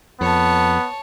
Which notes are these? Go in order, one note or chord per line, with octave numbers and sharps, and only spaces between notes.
F2 B3 C#5 A5